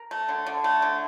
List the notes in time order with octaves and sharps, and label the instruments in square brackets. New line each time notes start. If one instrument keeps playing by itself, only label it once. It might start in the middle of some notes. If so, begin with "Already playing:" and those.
Already playing: [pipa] A#4
A3
D3
D3
A3
D3